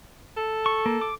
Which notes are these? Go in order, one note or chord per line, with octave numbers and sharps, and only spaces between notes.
A4
C#6
A#3
D6